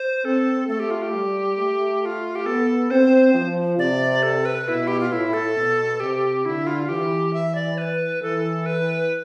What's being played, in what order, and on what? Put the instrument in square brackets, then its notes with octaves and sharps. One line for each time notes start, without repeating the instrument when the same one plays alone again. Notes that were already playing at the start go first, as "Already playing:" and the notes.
Already playing: [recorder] C5
[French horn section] C4 [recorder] A4
[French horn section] A3 [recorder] A4
[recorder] G4
F4
G4
[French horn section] G3
A3
[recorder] G4
F4
G4
[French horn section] B3 [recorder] A4
[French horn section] C4 [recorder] C5
[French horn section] F3
[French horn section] C3 [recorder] D5
[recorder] A4
B4
[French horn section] B2 [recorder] E4
[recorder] G4
F4
[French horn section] A2 [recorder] E4
[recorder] A4
[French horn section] B2
[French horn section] C3 [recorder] G4
[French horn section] D3 [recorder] E4
[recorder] F4
[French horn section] E3 [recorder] G4
[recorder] E5
D5
B4
[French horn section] E3 [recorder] A4
[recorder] B4